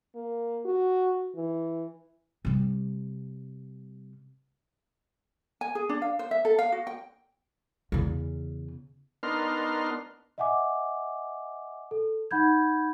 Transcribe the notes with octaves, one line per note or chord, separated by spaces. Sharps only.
A#3
F#4
E3
C3 G3
G#5
G#4
D4
F5
C5
E5
A4
F5
F#4
G5
E2 C#3
B3 D4 D#4 A#4 C6 F6
D#5 E5 F#5 G#5 D6
A4
D#4 F#5 B5 G6 G#6